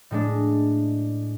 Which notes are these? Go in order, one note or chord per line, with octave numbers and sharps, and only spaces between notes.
A2 G#3 D4